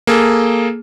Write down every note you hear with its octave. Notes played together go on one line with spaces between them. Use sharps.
A#3 G#4 A4